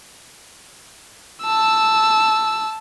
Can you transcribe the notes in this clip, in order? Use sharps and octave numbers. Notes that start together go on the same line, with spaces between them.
A5 E6